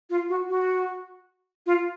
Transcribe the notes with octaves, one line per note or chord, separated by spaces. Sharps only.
F4
F#4
F#4
F4